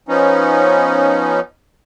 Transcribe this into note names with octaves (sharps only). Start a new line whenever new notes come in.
F3 B3 C#4 D#4